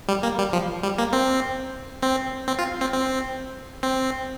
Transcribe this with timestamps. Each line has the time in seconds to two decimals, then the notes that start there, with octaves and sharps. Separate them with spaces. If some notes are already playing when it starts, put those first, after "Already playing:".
0.08 G3
0.23 A#3
0.38 G3
0.53 F3
0.83 G3
0.98 A#3
1.13 C4
2.03 C4
2.48 C4
2.59 F4
2.81 C4
2.93 C4
3.83 C4